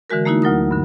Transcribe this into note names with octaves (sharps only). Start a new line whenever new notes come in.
D3 E3 G#3 F#4 A#4
A3 A#3 D#4 E4 F#4
D2 F#3 A#4 D#6
G2 D3